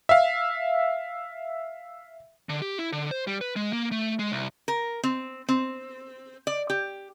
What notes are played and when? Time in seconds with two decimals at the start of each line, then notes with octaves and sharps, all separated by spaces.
0.09 E5 F5
2.49 D3
2.62 G4
2.78 E4
2.93 D3
3.11 C5
3.27 G3
3.41 B4
3.56 G#3
3.73 A#3
3.92 A3
4.19 G#3
4.32 C2
4.68 A#4
5.03 C4
5.49 C4
6.47 D5
6.70 G4